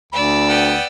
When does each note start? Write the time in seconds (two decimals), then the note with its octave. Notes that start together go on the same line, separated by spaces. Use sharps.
0.13 D2 D5 B5 E6
0.49 B3 F#5 G5